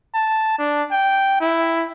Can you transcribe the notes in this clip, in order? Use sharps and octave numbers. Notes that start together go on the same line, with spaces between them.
A5
D4
G5
E4